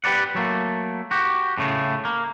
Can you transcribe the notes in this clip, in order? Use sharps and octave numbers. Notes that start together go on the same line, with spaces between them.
G4 B4 D5 F#5
F#3 A3 A#3
F#4 G4
A2 C#3 A3
A#3